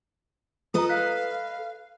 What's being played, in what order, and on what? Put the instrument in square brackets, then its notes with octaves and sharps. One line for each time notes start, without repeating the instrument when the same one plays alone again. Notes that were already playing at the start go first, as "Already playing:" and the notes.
[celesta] F4 A#5 [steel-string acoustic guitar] A4 B4 D#5 [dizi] D#6
[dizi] F5 [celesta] F#6 B6